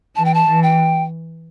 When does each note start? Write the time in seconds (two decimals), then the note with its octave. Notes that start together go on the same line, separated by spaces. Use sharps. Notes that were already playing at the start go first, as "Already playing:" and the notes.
0.16 E3 A5
0.25 G5
0.34 A5
0.47 E3
0.63 G5